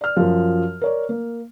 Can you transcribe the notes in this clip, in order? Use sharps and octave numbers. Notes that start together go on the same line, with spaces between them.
D5 F6
F#2 F3
A#4 C#5 D5
A#3